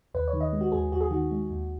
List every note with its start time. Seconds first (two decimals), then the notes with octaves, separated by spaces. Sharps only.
0.14 D#2 B4
0.28 C#5
0.33 D#3
0.41 D#5
0.53 G#3
0.61 F#4
0.72 D#2 G#4
0.91 D#2 F#4
1.01 G#4
1.11 D#3 F#4
1.31 G#3
1.50 D#2